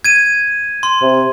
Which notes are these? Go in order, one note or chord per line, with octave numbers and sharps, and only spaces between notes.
G#6 D#7
C6
C3